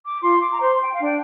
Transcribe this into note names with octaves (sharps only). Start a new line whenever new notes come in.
D6
F4 C6
D6
A#5
C5 C6
G5
F5
D4 G5